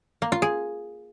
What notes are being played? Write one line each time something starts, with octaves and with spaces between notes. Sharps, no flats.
A#3
F4
G#4